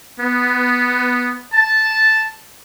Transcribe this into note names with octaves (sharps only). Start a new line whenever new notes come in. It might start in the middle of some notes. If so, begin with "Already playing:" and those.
B3
A5